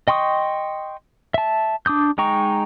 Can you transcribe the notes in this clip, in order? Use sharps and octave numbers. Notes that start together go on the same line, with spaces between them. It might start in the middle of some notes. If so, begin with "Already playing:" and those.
D#5 G5 C6 C#6 D#6
E5 A5
D4 D6 D#6 G6
G#3 D#4 G5 A#5 C#6